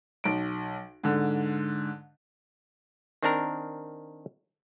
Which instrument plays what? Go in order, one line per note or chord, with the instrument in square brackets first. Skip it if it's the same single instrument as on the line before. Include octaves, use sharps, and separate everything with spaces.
[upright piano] B1 D7
G#2 D3
[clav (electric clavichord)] D#3 C4 D4 A#4